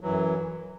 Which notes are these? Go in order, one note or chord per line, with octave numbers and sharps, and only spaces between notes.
F#2 E3 F#3